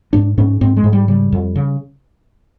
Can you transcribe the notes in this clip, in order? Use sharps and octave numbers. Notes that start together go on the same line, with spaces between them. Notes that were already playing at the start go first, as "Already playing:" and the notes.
G#2 D4
G#2 C#4
G#2 C4
G#3
G#2
G3
C#3 G3
F2
C#3